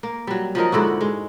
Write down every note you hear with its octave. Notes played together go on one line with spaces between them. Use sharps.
A#3
F#3 G3
F3 F#3 D#4 A#4
G#2 D3 E4 F#4
G#3